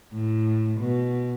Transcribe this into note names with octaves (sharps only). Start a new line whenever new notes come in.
A2
B2